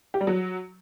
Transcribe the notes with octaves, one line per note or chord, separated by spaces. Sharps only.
G4
G3
F#3